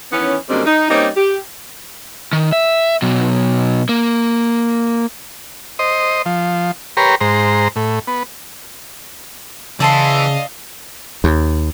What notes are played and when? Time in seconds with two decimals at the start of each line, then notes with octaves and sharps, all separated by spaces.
0.12 D#3 E3 B3 C#4
0.49 F#2 D3 G3 G#3 A#3 C4
0.66 D#4
0.90 G3 A#3 C4 C#4 D#4
1.17 G4
2.33 D#3
2.53 E5
3.02 B2 F#3
3.89 A#3
5.79 C5 D#5
6.26 F3
6.97 G4 A#4 B4 C#5 A#5 C6
7.21 G#2 C5 A#5
7.76 A2
8.07 B3
9.80 C#3 E3 D5 D#5 F5 A5 C6
11.24 D#2